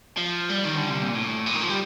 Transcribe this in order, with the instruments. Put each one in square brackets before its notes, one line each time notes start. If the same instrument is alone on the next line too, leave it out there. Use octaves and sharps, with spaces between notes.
[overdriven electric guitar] F3
G3
D#3
D3
C3
A#2
A2
A#2
D#3
F3
G3